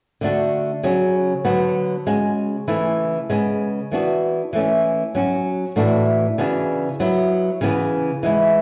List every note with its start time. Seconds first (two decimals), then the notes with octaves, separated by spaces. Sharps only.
0.21 D3 A3 D4 F#4
0.83 C#3 F#3 C#4 F#4
1.45 D3 F#3 B3 F#4
2.06 C#3 G#3 C#4 F#4
2.68 C#3 E3 A3 E4
3.30 C#3 G#3 B3
3.91 E3 B3 D4 F#4
4.53 E3 A3 C#4
5.15 F#3 C#4 F#4
5.76 A2 E3 A3 D4 F#4
6.38 C#3 E3 B3 D4 F#4
7.00 F#3 B3 E4
7.61 C#3 E3 B3
8.23 E3 G#3 B3 E4